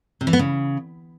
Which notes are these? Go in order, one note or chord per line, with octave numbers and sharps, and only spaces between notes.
C3
E3
B3
C#3